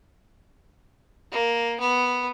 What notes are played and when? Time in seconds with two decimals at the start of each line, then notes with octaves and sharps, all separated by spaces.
1.31 A#3
1.80 B3